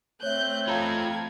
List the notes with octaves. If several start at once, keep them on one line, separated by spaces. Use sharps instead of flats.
A3 C4 C#5 E5 F#6 G6
F4 A4 F5 A#5 B5 G#6